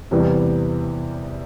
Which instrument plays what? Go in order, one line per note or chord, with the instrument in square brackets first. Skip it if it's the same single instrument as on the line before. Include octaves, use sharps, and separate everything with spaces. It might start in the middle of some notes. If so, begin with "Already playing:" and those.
[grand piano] E2 C3 E3 G3 B3